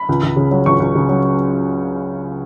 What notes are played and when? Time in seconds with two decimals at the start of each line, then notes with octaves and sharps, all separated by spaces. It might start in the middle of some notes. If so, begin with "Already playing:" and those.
Already playing: B5
0.09 C#2
0.23 C#2
0.36 C#3
0.51 F#3
0.66 C#2 C#6
0.80 C#2
0.95 C#3
1.09 F#3